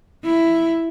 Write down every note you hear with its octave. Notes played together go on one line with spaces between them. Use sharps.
E4